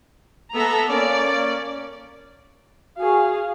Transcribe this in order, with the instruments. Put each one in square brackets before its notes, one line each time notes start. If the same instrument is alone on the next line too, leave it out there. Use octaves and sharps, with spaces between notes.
[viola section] B3 E5 A#5 [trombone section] A4
[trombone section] A#3 C#4 [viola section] D5
[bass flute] F#4 [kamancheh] G#4 F5